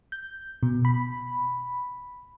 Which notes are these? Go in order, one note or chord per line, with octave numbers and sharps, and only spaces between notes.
G6
B2
B5